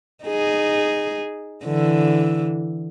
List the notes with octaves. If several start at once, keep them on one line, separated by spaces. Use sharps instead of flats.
D#4 G#4
D3 E3